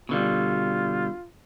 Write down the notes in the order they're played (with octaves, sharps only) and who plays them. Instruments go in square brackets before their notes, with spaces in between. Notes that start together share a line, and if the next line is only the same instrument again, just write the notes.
[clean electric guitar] B2 D3 G3 [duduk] F4